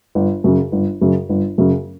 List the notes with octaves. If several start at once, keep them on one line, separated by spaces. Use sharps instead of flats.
G1
F#2 C#3
G1
F#2 C#3
G1
F#2 C#3